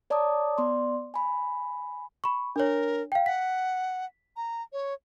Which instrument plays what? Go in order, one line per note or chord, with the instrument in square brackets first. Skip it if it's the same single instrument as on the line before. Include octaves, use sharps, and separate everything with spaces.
[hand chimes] C#5 D5 A5 A#5 D6 D#6
B3 D5 C6
G#5 B5
[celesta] B5 C#6
[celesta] D4 C#5 [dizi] A#4
[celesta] F5 G5
[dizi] F#5 [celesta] B6
[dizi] A#5
C#5